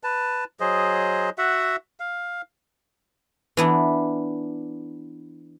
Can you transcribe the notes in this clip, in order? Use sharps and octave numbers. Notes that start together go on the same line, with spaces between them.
B4 A5
F#3 G#4 C5 D#5
F#4 E5 F#5
F5
E3 B3 D4